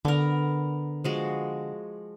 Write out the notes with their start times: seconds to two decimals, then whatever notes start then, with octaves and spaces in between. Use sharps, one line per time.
0.05 D3 B3 A#4
1.04 F3 G#3 F#4